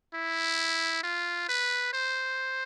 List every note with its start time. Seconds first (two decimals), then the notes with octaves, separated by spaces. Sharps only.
0.14 E4
1.04 F4
1.49 B4
1.93 C5